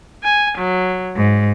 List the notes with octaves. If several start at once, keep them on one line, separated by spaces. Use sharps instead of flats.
G#5
F#3
G#2